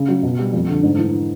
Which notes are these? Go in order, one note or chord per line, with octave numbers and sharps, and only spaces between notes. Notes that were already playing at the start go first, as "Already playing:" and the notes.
Already playing: C#3
F#3
B2
G3
F2
D3
G#2
E3